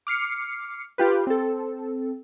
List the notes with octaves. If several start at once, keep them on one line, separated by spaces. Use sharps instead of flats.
D6 F6 C7 C#7
F4 G4 B4
C4 A4